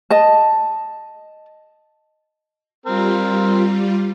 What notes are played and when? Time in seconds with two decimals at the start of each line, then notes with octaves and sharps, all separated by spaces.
0.10 D#5 A5
2.86 G3 C4 F4 A#4